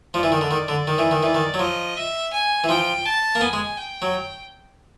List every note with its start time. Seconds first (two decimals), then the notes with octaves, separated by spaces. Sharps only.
0.14 F3 D5
0.23 E3
0.32 D#3
0.41 D3
0.51 D#3
0.68 D3
0.87 D#3
0.98 E3
1.11 D#3
1.23 E3 D5
1.35 D#3
1.54 F#3
1.59 F3 D#5
1.96 E5
2.32 G#5
2.64 E3
2.69 F3 G5
3.05 A5
3.35 A#3
3.41 B3 G#5
3.53 G#3
3.77 G5
4.02 F#3